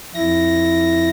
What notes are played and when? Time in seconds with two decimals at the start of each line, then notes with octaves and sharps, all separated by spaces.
0.15 F2 E4 A#6